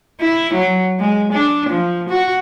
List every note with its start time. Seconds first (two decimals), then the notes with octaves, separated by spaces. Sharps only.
0.20 E4
0.54 F#3
1.00 G#3
1.33 D4
1.70 F3
2.10 F#4